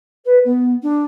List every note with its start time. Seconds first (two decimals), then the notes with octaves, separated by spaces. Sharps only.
0.25 B4
0.45 B3
0.82 D4